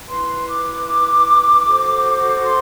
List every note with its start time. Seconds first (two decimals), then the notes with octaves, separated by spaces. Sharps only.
0.07 E4 B4 C6
0.46 D6
1.66 F#4 A4 C5
2.44 C6